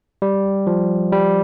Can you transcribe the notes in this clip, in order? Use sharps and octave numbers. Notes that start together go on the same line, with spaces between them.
G3
F3
G3